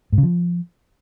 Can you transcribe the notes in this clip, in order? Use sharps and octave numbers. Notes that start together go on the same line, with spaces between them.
G#2
C#3
F3